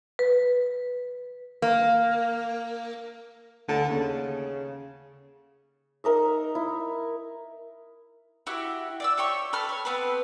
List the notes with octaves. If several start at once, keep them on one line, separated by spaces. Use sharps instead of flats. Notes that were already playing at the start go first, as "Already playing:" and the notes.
B4
A#3
D2 D3 A4 A5
D#2 C#3
D#4 A#4 D#5 E5
E4
E4 F#4 G4
D5 E5 E6
G4 C#5 G5 C#6
A4 B4 E6 F6
C#5
B3 C4 A4 B4